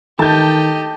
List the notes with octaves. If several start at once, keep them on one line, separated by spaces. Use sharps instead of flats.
D#3 G4 A4 D#5 A5 G6